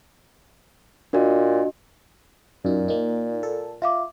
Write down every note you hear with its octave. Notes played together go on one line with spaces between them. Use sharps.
A#2 D4 F#4 D#5
F#2 A#2 D#4
A#3 D#4
A4
F4 E5 F5 D6